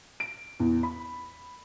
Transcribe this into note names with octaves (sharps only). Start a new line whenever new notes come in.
D7
E2
B5